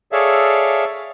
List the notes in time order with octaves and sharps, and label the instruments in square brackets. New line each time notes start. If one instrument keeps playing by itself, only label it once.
[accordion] G#4 A4 C#5 D5 E5 F5